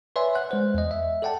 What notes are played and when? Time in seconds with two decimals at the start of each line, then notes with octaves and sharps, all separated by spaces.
0.16 B4 C#5 D5 E5 G#5 C6
0.35 F#5 F#6
0.51 G#3 C5
0.74 E2 D#5
0.91 E5
1.22 A4 D5 F#5 G5 A5